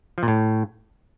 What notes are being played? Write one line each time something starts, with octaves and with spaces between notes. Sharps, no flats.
F3
A#2
A2